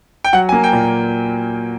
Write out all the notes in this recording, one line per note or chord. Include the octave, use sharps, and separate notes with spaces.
G5
F#3 F#5
G#5
A#3
G5
A#2